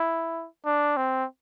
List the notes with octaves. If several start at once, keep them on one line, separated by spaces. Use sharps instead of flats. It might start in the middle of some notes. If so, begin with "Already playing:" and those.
Already playing: E4
D4
C4